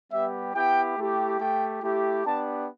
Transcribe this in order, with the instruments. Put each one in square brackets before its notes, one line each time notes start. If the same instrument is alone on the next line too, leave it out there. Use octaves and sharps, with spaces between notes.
[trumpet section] G3 B3 G4 E5
B3 E4 G4 G5
A3 E4 G4
A3 G4 G5
A3 E4 G4
B3 D4 G4 A5